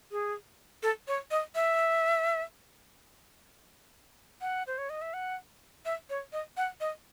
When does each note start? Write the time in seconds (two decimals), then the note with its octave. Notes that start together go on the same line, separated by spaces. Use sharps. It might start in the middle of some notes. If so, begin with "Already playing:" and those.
0.12 G#4
0.83 A4
1.08 C#5
1.31 D#5
1.55 E5
4.41 F#5
4.67 C5
4.78 C#5
4.90 D#5
5.02 E5
5.14 F#5
5.85 E5
6.10 C#5
6.33 D#5
6.57 F#5
6.81 D#5